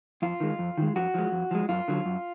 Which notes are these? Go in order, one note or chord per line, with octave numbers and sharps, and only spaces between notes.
F2 F4
D#3 G#3
F2
D#3 G#3
F2 F#4
F3 G#3
F2
F3 G#3
F#2 F4
D3 F#3
F#2